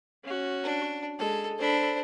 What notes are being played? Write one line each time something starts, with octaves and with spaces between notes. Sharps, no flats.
C#4 F#4
D4
G#3 A4
D4 A4 C5 B5